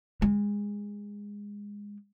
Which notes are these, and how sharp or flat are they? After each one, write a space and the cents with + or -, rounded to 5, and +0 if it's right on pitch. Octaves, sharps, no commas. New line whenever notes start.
G#3 -20